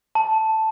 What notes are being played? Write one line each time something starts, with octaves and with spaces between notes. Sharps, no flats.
A5